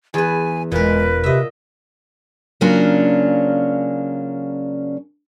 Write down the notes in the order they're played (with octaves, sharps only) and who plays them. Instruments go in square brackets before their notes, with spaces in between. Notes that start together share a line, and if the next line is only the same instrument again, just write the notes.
[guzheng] E2 B4 [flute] G#5
[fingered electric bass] E1 [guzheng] A#2 A#4 [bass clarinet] G#3 [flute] B4
[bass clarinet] C3 [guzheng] D#5 E5
[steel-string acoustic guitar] C#3 F#3 A#3 C#4 D4 F4